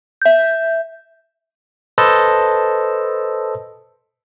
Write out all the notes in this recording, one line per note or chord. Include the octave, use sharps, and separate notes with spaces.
E5 G6
A4 B4 C5 D#5 A5 E6